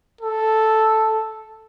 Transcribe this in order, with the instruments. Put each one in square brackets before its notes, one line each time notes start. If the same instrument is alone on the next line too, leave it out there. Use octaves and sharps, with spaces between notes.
[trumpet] A4